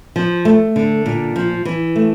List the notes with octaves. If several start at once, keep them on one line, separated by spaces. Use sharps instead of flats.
F3
A3
D3
A#2
F3
E3
A3